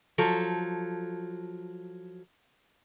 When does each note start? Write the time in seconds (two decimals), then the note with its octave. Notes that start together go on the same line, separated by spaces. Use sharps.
0.18 F3 F#3 A4